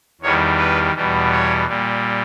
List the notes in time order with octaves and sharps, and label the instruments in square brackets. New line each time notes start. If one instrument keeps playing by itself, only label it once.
[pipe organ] E2 D#3 G3 C#5
B4
E2 B2 G3
C#5
A#2 G3